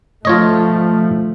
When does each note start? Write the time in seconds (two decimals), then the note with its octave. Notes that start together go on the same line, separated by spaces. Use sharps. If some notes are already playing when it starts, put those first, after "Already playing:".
0.25 F3 A3 F4 C#5 D#5